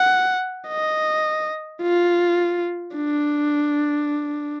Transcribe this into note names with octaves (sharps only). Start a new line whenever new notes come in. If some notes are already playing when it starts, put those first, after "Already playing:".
Already playing: F#5
D#5
F4
D4